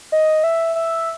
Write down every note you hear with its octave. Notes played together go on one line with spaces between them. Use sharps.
D#5
E5
E5